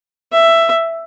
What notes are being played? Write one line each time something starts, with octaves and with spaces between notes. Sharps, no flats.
E5